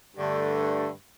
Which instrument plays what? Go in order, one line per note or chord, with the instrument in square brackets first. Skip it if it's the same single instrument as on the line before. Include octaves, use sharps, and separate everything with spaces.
[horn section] G2 D3 A3